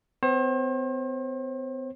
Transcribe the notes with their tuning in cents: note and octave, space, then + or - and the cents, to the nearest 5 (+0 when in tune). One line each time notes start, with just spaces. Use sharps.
C4 -45 C5 +40